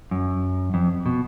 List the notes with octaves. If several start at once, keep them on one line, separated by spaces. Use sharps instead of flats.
F#2
F2
B2